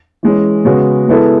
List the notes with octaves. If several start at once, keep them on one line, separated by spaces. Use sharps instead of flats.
E3 G#3 C#4
C#3 G#3 B3 F#4
G#3 B3 E4 A4